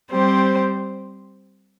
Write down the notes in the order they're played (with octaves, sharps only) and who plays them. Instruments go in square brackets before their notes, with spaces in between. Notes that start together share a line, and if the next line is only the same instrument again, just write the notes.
[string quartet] G3 C4 G4 C5